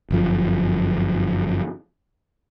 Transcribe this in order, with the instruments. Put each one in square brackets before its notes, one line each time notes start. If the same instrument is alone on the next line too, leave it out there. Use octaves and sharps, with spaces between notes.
[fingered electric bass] G1 F#2 F3